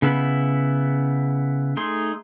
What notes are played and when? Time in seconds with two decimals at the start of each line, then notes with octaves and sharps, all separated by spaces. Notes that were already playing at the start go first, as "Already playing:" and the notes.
0.02 C#3 B3 E4 B5
1.77 A3 D#4 G#4 C6